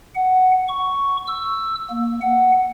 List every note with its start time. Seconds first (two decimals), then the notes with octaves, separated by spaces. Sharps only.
0.15 F#5
0.68 C#6
1.27 E6
1.90 A#3
2.22 F#5